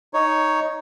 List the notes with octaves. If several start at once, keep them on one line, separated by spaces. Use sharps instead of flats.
D#4 C#5